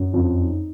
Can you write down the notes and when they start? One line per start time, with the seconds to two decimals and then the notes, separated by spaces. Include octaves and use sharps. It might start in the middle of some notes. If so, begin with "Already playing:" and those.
Already playing: F#2
0.13 F2
0.40 D#4